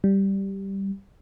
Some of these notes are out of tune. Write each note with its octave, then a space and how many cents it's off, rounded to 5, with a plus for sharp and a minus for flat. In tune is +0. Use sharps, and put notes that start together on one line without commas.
G3 -5